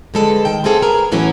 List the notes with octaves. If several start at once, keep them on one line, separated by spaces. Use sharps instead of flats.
D3 G#3 A4 B4
D#3 G5
A3 A#3 C4 C#4 G#4 A4
G#4 A#4 B4
E2 A2 E3 F#3 B3 C#4